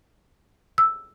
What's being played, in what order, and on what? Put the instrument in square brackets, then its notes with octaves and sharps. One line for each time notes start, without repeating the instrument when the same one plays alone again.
[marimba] E6